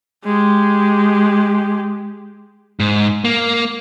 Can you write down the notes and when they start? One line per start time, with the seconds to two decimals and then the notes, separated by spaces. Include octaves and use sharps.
0.24 G#3 G4
2.80 G#2
3.25 A#3